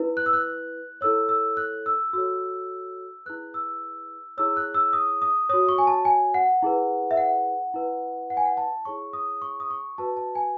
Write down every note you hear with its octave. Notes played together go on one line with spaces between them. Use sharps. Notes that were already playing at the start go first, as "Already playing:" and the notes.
Already playing: E4 B4
F#6
E6
F#6
E4 A4 C#5 E6
E6
F#6
E6
F#4 A4 C#5 E6
E4 G#4 B4 F#6
E6
E4 G#4 C#5 E6
F#6
E6
D#6
D#6
F#4 C#5 D#6
C#6
G#5
A5
G#5
F#5
E4 G#4 B4
E5
F#5
E4 B4
F#5
G#5
F#5
A5
E4 G#4 C#5 C#6
D#6
C#6
D#6
C#6
F#4 B4 A5
A5
G#5